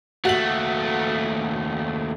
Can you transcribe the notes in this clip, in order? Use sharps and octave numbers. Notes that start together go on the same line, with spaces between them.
D#2 A3 F#4 F#7